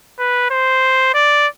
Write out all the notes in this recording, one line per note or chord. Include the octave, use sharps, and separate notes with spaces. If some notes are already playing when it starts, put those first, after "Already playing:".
B4
C5
D5